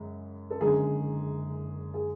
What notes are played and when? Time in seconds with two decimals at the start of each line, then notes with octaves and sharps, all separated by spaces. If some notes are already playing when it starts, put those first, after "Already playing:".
Already playing: F#2 C#3 G#3
0.50 A4
0.60 F#1 F#2 D3 G#3 G#4
1.94 G#4